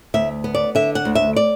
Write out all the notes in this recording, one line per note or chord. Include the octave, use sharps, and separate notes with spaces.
D2 E5
B3
D5
D3 E5
F#5
D2
E5
D5